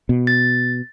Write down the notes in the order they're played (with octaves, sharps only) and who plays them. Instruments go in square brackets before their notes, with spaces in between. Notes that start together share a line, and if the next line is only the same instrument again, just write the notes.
[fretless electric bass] B2
[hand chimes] A6